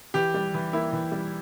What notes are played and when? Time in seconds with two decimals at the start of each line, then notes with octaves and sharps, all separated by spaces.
0.14 E3 G4
0.34 G3
0.54 E3
0.73 A#3 E4
0.93 E3
1.12 G3